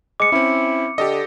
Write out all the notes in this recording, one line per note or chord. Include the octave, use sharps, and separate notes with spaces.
G#3 D6 C#7
C4 C#4 E4
D3 G4 A4 D#5